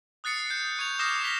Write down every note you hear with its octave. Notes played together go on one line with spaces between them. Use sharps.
D#6 F#6 A6 C7 C#7
G6 C#7
C#6 G#6 F7
D6 D#6 F6 A#6 C7 E7
D#6 B6 F7 G7